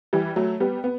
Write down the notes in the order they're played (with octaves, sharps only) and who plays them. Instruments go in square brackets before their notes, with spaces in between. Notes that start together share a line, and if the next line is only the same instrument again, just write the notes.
[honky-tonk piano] E3 G3
F#3 A3
G3 B3
B3